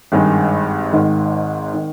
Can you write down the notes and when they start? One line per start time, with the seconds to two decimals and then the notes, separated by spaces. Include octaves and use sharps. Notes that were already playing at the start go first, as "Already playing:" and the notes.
0.12 G#1 G2 D#3 G#3
0.93 G#1 G#2 D#3
1.74 D#3